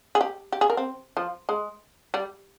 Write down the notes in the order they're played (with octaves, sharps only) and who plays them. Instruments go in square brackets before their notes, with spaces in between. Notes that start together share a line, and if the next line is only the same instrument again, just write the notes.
[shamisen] G#4
G4
G4
G#4
A#4
C4
F3
G#3
G3